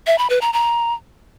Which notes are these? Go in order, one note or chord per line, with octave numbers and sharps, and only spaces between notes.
E5
B5
B4
A#5
A#5